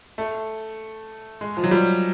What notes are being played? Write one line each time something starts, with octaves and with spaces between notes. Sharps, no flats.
A3
G#3
F3
F#3
G3